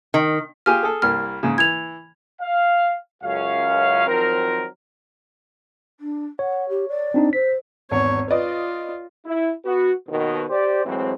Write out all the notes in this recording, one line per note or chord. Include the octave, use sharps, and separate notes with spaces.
D#3
F4 G4 G#4 G#5 F6
G#4 A4
C2 G3 A#3 F6
G#2 C#3
E3 G#6 F7
F5
C#2 F#2 C#4 F5
D#3 F3 F#3 C4 A#4
D4
C#5 F#5
G4
D5
C4 D4 D#4
C5 B6
G#1 E2 C#5
F4 B4 D5 D#5
E4
B3 F#4
D#2 B2 D#3
G4 C5 D5
A2 E3 F#3 G#3 C4